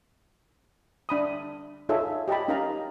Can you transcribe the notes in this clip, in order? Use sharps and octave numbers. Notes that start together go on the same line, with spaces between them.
D4 B5 D#6
D#4 F4 G#4 A4 C#5 E5
G4 D#5 G5 A5 B5
C#4 D#4 A#4 D#5 F5 A#5